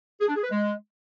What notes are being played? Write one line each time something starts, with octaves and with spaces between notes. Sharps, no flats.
G#4
D4
G#4
B4
G#3